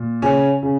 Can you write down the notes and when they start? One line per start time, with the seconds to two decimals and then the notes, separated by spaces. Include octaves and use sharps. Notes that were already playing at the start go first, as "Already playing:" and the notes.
Already playing: A#2
0.22 C#3 C#4
0.63 C#3